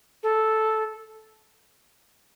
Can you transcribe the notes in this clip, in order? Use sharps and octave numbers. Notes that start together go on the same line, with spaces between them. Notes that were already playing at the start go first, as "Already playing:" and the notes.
A4